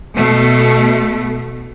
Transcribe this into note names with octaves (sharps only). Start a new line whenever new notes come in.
B2 A3